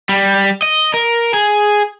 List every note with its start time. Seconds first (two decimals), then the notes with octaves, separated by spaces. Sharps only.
0.09 G3
0.62 D#5
0.94 A#4
1.34 G#4